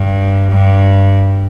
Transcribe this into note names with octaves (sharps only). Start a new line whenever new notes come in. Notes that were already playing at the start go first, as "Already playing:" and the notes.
Already playing: G2
G2